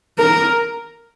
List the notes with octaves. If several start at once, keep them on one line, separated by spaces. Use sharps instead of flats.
A#4